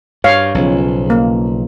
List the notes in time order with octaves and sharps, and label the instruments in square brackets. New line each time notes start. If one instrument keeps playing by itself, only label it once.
[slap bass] G2 [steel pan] C#5 F5
[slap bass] B1 [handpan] C#3 F3 C#4
[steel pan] A#3